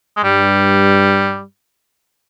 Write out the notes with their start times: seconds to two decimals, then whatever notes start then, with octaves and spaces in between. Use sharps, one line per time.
0.17 G#3
0.24 G2 G3